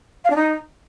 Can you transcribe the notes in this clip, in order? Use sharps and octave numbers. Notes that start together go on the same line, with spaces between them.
F5
D4
D#4